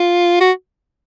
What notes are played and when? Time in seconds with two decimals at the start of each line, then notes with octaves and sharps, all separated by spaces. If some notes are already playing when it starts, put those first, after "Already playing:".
Already playing: F4
0.41 F#4